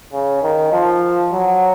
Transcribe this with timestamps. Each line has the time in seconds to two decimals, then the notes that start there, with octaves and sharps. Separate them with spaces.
0.13 C#3
0.43 D#3
0.73 F3
1.33 F#3